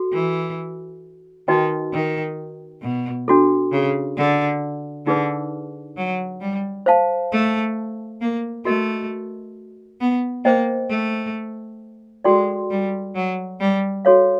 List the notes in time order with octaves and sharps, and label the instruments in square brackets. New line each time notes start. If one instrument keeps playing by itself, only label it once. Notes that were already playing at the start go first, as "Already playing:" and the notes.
Already playing: [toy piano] F#4 A4
[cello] E3
[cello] D#3 [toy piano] D#4 F#4 B4 D#5 G5
[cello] D#3
B2
[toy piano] D4 F#4 A4
[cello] C#3
D3
[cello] D3 [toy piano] D#4 G#4 B4
[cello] F#3
G3
[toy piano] C5 F5 A5
[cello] A3
A#3
[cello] A3 [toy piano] F#4 A#4 D#5
[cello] B3
[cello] A#3 [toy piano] C5 D#5 G5
[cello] A3
[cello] G#3 [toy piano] F#4 A4 D5 G5 C6
[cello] G3
F#3
G3
[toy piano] F#4 A4 C#5 F5